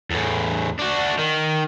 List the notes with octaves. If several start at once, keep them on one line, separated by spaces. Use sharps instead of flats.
E2 A2
D4 F#4
D#3